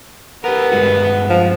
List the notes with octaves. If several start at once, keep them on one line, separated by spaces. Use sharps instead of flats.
B3 G4 A#4
G2 G#3 F#4
F3